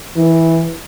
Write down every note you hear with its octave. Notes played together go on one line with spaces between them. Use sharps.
E3